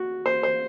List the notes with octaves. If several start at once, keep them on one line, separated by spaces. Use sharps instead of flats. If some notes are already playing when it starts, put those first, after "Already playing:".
Already playing: F#4
C5
C5